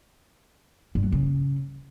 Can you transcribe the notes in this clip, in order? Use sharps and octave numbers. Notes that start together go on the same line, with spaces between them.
G2
F#3
C#3